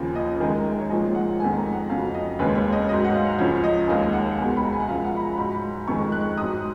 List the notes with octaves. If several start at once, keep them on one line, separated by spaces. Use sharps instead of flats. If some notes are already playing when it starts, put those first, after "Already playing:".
Already playing: D#2 C#3 F3
D#5
F#2 D#3 G#3
C#5
A#2 F3 G#3 D#5
F#5
F2 D#3 G#3 G#5
A#5
F#5
F2 C#3 F#3 F5
D#5
D#2 C#3 G#3 B4
C#5
D#5
G#2 F#3 D#5
F#5
F5
C#2 C#3 F3 C#5
D#5
D#2 D#3 G#3 F5
F#5
C#2 B2 G#3
B5
A#5
G#5
F#5
F#2 F3 G#3 F5
F#5
B5
A#5
G#2 F#3 B5
F2 D#3 G#3 C#6
F#6
G#2 F#3 D#6